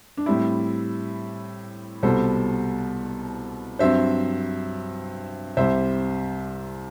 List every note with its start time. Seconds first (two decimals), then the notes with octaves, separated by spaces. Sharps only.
0.17 D4
0.26 A2 G3 C4 E4
2.03 C2 B2 G3 B3 A4 C5
3.79 G2 F#3 C4 C5 E5
5.57 C2 C3 G3 C5 E5